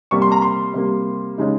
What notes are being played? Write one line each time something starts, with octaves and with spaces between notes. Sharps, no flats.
C3 G3 A#3 C#6
C6
A#5
C6
C3 G3 A#3
C#3 G#3 D#4